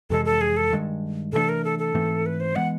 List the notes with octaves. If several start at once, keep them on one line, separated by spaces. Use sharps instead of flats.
F2 C3 E3 G#3 A4
A4
G#4
A4
G2 D#3 G#3
C3 E3 A3 D4 A4
A#4
A4
A4
G#2 E3 A3 C4
B4
C5
E3 G#3 B3 F#5